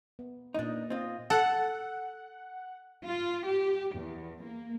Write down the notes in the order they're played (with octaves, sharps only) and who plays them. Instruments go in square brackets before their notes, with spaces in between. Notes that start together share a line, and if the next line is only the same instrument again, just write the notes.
[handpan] B3
[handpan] A#2 A#3 D#5 [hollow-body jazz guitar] D4 D#4
[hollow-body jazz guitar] C4 F4 [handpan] D#5
[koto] A4 [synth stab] F#5
[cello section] F4
G4
E2
A#3